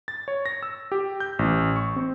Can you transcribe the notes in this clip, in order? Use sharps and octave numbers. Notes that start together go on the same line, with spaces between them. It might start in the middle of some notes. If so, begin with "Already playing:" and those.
A6
C#5
A#6
E6
G4
G6
A1
C#6
C4